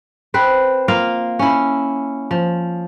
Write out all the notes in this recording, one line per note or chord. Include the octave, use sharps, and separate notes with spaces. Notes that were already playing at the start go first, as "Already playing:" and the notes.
C4 B4 C5
A#3 F4 F5
C#4 E4
F3